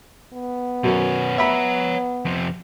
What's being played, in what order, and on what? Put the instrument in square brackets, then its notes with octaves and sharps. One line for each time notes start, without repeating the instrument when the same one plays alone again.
[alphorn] B3
[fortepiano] F#2 [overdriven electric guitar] B2 C#4
[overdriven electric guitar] C#5 A#5 [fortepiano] E5 B5
[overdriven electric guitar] F2 C3